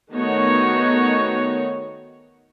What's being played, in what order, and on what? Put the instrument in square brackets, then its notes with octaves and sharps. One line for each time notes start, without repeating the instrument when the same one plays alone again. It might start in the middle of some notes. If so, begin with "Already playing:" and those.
[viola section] D#3 A3 B3 D#4 F#4 C#5